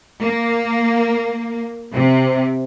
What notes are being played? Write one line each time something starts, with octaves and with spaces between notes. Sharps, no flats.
A#3
C3